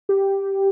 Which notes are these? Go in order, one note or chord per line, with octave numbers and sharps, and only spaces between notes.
G4